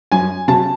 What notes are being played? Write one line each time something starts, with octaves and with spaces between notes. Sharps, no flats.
F#2 G#5
C#3 F#3 A5